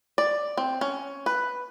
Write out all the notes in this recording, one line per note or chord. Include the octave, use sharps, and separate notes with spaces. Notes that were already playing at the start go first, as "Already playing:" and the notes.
D5
C4
C#4
B4